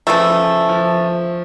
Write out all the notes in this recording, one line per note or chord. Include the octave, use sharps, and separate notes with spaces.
C#3 E3 F3 A3
F3